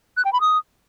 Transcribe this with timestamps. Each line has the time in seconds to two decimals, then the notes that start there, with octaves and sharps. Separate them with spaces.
0.17 F#6
0.25 G5
0.33 B5
0.41 D#6